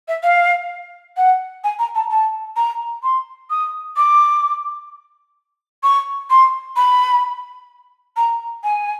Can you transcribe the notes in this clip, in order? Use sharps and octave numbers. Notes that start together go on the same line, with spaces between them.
E5
F5
F#5
G#5
A#5
A5
A5
A#5
C6
D#6
D6
C#6
C6
B5
A#5
G#5